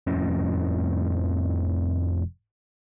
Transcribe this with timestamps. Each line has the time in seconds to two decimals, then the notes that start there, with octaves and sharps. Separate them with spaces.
0.07 F1 F2 A2 C#4